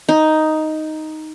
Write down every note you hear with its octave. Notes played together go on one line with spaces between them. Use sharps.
D#4